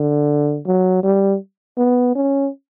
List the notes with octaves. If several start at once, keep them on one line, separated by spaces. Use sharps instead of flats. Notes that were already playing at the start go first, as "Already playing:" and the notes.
Already playing: D3
F#3
G3
B3
C#4